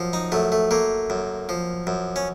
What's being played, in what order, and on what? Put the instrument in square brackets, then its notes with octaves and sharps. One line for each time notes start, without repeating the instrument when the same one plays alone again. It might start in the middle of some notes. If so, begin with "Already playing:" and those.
Already playing: [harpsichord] F#2 F3
D#4
F#2 A3
A3
A3 A#3
F#2
F3
F#2
C#4